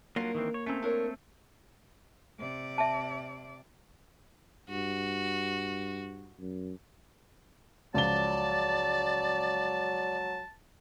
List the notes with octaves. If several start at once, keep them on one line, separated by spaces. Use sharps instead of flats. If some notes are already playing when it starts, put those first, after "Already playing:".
F#3 G3 A#3 D4 F4 A#4
D#3 E3 C4
C#5
A3 C4 C#4 A#5
D4 A#4 C#5
C3 D5
E5 A5
G2 F#4
F#2
C#2 F3 F#3 D5 A5 G7